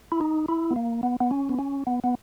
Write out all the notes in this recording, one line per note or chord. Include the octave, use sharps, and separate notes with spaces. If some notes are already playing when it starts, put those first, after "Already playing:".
E4
D#4
E4
B3
A#3
B3
B3
C#4
B3
C#4
B3
B3